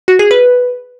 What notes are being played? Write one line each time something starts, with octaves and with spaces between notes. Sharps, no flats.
F#4
G#4
B4